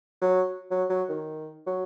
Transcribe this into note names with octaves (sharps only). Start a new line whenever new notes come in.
F#3
F#3
F#3
D#3
F#3